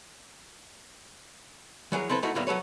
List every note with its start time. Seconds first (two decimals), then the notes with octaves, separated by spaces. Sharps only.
1.92 E3 F#3 G#4 A#4
2.09 C4 E4 A4 B4 C5
2.23 A3 D#4 E4 F#4 A#4
2.35 A2 D3 F#3 G3 A#3 B3
2.47 F#3 A4 B4 C#5